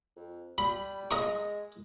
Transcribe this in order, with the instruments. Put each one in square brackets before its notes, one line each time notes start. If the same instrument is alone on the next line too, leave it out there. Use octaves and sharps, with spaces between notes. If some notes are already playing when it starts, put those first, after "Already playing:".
[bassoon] F2
[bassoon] G3 [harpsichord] B5
[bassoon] G#3 [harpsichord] D#5 A#5 C#6